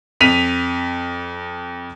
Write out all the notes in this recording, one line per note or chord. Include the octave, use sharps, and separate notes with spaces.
F2 B6 D#7 F7